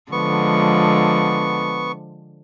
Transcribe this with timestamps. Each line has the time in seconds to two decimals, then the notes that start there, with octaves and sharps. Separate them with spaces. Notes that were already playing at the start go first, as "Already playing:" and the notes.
0.12 D3 F3 G#3 B3 C#6